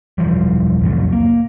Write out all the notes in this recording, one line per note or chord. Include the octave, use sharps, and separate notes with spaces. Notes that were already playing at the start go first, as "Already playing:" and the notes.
E1 E3 F3 G3
C2 F2 A2 F#3
A#3